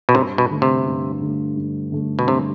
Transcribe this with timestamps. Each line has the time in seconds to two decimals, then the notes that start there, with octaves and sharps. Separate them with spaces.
0.09 B2
0.14 G2 C3
0.38 B2
0.51 D3 A3
0.62 C3
0.86 G2
1.21 D3 A3
1.57 G2
1.92 D3 A3
2.19 B2
2.28 G2 C3